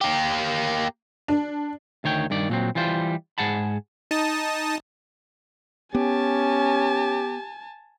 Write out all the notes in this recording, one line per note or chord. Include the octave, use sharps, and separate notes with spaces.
A#3 G4
D4
D2 D#3 C#5 G5
G2 D#3 D5
A#2 F#3 C4
E3 G3 F4 C5
G#2 G#4 F#5 A5 B5
D#4 A5 D#6
B3 C#4 G4 G#5 A5